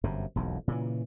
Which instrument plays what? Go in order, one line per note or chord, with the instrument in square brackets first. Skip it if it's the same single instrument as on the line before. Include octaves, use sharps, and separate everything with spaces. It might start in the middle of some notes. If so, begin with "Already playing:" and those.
[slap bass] G1 F#2 C3
E1 B1 F2
A#2 C#3 E3